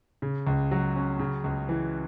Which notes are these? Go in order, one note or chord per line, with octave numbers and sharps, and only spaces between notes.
C#3
C#2
F#3
C#4
C#3
C#2
E3